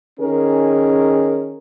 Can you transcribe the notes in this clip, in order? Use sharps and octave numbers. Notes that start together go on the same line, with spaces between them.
D#3 C#4 G#4 A#4